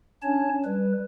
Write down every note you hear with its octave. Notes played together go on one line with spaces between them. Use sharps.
C#4 D4 C#5 A5
G3 B4